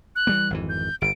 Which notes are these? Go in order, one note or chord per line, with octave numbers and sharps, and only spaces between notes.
F#6
E3 G3 A#3
G#1 F2 E3
G6
G1 D7